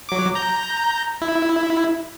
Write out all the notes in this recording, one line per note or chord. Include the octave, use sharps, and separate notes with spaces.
F#3 D6
A#5 G6
E4